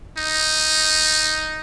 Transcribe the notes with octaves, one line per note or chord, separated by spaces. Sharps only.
D#4